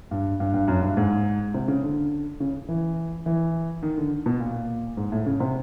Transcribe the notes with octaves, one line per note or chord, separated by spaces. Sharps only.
G2
G2
G2
F#2
G2
G#2
C3
C#3
D3
C#3
E3
E3
D#3
D3
B2
A#2
G#2
A2
C#3
C3